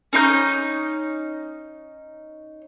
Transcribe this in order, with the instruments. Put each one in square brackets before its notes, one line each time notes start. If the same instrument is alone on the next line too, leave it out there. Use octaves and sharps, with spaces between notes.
[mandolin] C#4 D#4 C6 G6